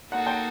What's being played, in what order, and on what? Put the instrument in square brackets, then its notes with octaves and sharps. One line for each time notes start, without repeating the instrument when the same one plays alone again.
[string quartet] A#3 D#4 F#4 A4 [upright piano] F#5
[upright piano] G5